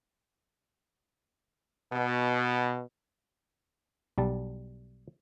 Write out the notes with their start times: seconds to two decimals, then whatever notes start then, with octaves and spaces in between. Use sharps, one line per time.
1.91 B2
4.18 B1 G3 A5